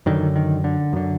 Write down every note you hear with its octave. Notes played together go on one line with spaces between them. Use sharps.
F#2 D3 D#3
D#3
D3
F#2 D3